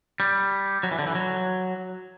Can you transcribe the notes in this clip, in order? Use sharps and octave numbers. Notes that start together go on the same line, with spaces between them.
G3
F#3
E3
D3
E3
F#3